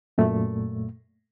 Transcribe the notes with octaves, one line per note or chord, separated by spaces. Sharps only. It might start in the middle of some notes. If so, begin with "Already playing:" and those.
F#2 A#2 A3